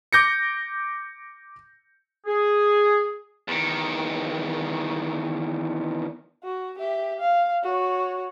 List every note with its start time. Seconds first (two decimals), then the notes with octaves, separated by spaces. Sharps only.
0.13 D6 G6 A#6 C#7
2.26 G#4
3.48 E2 D#3
6.44 F#4
6.79 G4 E5
7.20 F5
7.63 F#4 C#5